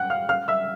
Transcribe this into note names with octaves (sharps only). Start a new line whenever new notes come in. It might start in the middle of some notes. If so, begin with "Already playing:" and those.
Already playing: F#5 G5 F#6
F5 F6
F5 F6
E5 E6